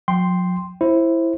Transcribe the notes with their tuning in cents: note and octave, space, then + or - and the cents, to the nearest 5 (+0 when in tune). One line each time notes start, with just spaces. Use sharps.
F#3 -45 G5 +0 C6 +0
E4 +5 C5 +15